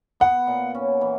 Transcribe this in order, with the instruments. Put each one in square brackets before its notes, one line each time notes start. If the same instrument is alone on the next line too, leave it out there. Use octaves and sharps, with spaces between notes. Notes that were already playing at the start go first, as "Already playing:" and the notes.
[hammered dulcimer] B3 [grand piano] F#5
[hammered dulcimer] A#2
C#4
E3